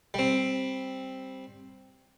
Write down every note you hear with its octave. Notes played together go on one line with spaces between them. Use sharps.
G3 C4